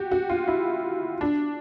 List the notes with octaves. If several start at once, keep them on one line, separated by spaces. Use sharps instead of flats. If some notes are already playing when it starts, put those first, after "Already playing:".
Already playing: F#4 G4
F#4
F4
E4
D4